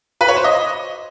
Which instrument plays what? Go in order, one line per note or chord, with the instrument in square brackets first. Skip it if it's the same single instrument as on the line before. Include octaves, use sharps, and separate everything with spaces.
[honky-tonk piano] B4
C#5
C5
D#5